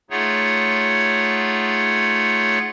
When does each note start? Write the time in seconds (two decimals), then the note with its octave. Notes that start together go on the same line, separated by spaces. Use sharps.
0.10 A3 D#4 F4 G#4 C#5 F#5